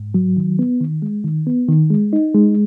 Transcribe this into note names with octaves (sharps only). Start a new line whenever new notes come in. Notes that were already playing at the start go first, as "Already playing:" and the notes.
Already playing: G#2
F#3
D#3
B3
D#3
G#3
D#3
B3
D#3
G#3
D#4
G#3